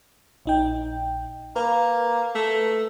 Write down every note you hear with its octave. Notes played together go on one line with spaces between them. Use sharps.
A#1 D#4 G5
A#3 B4
A3